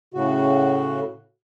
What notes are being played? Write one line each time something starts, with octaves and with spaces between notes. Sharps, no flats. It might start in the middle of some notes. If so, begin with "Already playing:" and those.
A2 C#3 F#4